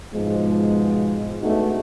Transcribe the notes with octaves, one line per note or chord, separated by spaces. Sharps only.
G#2 B2 F3 G#3
A3 B3 D4 D#4 F#4 G#4